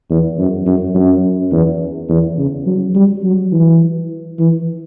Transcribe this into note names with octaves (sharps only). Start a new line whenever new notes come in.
E2
F#2
F#2
F#2
E2
E2
C#3
F#3
G3
F#3
E3
E3